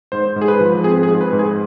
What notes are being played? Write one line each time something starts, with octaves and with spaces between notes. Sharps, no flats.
G#2 C5
G#2
G#4
B4
F3
C4 G#4
G#4
G#2
B4
G#2
G#4